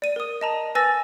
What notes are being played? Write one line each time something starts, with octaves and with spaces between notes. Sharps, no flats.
D5 D#7
A#4 D#6
D#5 A5 A#5
B4 G#5 E6 A6 A#6